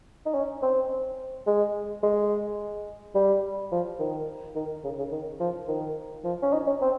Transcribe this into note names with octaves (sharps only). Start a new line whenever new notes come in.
D#4
C#4
C4
G#3
G#3
G3
F3
D#3
D#3
C#3
C#3
D#3
F3
D#3
F3
C#4
D#4
C#4
C4